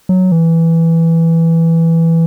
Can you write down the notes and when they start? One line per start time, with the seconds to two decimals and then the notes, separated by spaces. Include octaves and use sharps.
0.09 F#3
0.32 E3